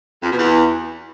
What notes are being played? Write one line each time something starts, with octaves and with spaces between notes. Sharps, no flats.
F2
B2
E2